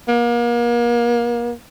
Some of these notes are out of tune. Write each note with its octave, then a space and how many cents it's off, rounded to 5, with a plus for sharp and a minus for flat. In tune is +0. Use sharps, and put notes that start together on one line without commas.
A#3 +35